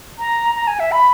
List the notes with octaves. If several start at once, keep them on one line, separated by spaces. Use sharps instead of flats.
A#5
A#5
G#5
E5
B5